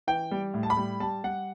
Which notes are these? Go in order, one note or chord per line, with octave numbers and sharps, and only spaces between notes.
E3 G5
G3
A2
A5
B5
G3
G3 A5
G3 F#5